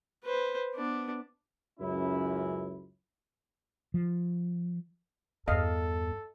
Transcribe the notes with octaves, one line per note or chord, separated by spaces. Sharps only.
B4 C5
B3 D4
C#2 F#2 C#4 E4
F3
E2 G2 A4 D#5 F5